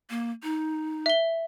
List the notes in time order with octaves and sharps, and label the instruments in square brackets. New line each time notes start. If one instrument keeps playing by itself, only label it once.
[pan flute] A#3
D#4
[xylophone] E5 G7